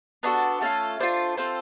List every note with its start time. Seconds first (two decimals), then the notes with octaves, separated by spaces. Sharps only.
0.23 B3 D4 F#4 A4
0.61 A3 C#4 F4 A4
1.00 A3 D4 F4 C5
1.37 C4 F4 A4 C5